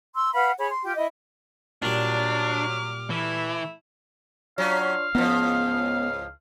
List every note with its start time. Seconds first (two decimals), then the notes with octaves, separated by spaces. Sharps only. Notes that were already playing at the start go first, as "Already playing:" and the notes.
0.15 C6 E6
0.34 B4 F5 F#5 B5
0.58 G#4 C#5 B5
0.71 C6
0.84 F4 G4 G5
0.96 E4 D#5
1.82 A#2 F#3 G3 D4 D6 F6
3.10 E3 A3 E4
4.58 F#3 C#4 D4 F4 C#5 F5
5.15 C#2 G#2 F3 B3